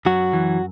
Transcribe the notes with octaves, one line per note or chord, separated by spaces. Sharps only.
F#2 F#3 F#4
E3